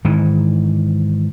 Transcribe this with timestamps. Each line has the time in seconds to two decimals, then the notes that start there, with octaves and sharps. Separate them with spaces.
0.05 G#2 D#3 E3